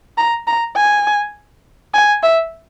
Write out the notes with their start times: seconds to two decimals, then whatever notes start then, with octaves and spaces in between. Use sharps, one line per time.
0.18 A#5
0.47 A#5
0.76 G#5
1.94 G#5
2.23 E5